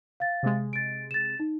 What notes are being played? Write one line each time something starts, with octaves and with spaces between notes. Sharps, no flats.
F5 A6
C3 G#3
A6 D7
A6 E7
D#4